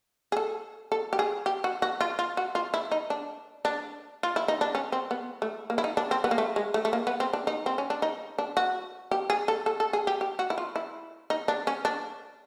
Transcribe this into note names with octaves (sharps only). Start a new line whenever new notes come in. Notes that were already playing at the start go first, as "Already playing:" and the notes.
G#4
A4
A4
G4
G#4
G4
F#4
F#4
F4
F4
F#4
F4
E4
D#4
D4
D4
F4
E4
D#4
D4
C#4
C4
B3
A3
A#3
E4
D#4
D4
C4
B3
A#3
A3
G#3
A3
A3
A#3
B3
C4
D4
D#4
C4
C#4
D4
D#4
D4
F#4
G4
G#4
A4
A4
A4
G#4
G4
G4
F#4
E4
F4
E4
D#4
D4
C#4
D4